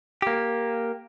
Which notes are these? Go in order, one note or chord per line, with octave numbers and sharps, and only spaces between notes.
A#3 G4